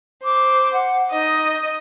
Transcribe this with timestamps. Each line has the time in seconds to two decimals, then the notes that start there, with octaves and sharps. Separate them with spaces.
0.24 C5 D6
0.73 F#5
1.12 D#4 D#5